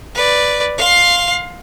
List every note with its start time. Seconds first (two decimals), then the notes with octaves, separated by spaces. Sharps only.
0.14 B4 D5
0.78 F5 C6